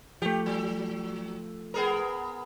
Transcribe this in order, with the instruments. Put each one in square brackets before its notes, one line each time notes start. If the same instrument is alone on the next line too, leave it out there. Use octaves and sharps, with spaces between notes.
[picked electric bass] F3 A3 [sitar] G4
[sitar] F#3
B3 G#4 A#4